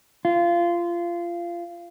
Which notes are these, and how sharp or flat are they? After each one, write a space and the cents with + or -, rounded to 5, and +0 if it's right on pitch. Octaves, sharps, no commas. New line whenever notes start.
F4 -20